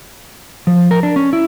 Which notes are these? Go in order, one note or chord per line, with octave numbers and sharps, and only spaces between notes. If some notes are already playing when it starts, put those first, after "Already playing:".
F3
A#4
D4
C#4
E4